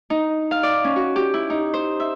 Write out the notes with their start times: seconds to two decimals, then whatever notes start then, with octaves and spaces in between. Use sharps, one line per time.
0.10 D#4
0.51 F5
0.63 D5
0.84 C#4
0.96 F#4
1.16 G4
1.34 E4
1.50 D#4
1.74 C5
2.00 E5